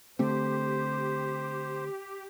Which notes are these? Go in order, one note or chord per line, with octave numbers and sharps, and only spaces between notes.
D3 A3 C4 G4 C5